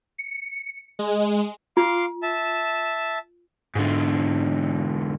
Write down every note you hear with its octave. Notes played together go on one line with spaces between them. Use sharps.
C#7
G#3
F4 F5 C6 D6
E5 A5
G#2 D3